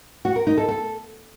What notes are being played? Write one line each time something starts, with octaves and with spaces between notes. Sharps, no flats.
F#4
A#4
D#4
A4
A4